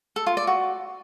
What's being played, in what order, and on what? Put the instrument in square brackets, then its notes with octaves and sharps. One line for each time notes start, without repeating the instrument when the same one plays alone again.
[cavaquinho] A4
F4
D5
F#4